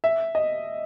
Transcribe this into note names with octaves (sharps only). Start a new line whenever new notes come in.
E5
D#5